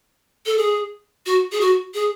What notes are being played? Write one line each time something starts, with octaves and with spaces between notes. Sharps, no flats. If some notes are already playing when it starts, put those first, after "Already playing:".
A4
G#4
F#4
G#4
F#4
G#4